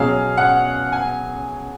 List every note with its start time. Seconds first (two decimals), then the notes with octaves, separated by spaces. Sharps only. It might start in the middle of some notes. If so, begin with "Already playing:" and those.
Already playing: B2 F#3 C#4 G#4 F5
0.37 F#5
0.92 G#5